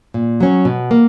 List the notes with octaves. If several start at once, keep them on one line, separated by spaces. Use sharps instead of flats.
A#2
F#3 C#4
B2
A#3